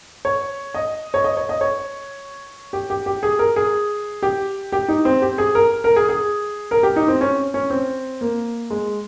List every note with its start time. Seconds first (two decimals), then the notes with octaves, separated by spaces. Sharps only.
0.25 C#5
0.74 D#5
1.14 C#5
1.24 D#5
1.37 C#5
1.49 D#5
1.61 C#5
2.73 G4
2.90 G4
3.06 G4
3.23 G#4
3.39 A#4
3.56 G#4
4.23 G4
4.72 G4
4.89 D#4
5.05 C4
5.22 G4
5.38 G#4
5.55 A#4
5.84 A#4
5.96 G#4
6.09 G#4
6.71 A#4
6.83 G4
6.96 D#4
7.08 C4
7.21 C#4
7.54 C#4
7.70 C4
8.21 A#3
8.70 G#3